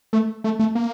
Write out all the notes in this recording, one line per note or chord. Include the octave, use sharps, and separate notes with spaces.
A3
A3
A3
A#3